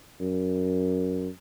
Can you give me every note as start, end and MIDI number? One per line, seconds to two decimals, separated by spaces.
0.20 1.28 42